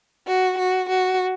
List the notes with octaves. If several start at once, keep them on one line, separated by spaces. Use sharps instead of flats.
F#4
F#4
F#4